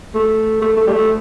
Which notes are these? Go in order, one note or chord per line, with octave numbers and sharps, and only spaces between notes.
A3
A3
A3
G3
A3